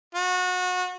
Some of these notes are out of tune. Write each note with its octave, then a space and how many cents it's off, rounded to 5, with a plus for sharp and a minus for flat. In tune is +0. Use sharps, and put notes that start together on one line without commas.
F#4 -30